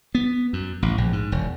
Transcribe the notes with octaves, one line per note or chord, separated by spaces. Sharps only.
B3
F#2
A1
A#1
G#2
E1